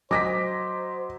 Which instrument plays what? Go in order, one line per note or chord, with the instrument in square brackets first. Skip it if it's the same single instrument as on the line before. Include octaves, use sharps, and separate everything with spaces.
[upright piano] F#3 [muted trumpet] C5 [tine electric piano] D#5 [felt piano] D6 A#6 B6